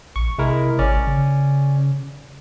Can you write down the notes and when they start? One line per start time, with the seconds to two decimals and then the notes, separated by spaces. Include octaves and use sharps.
0.16 A#1 C#6
0.38 C3 G#3 E4 A#4
0.79 G#1 C#4 D5
1.07 C#3